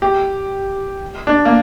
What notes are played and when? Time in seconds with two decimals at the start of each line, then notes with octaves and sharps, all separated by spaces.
0.02 G4
1.27 D4
1.45 A#3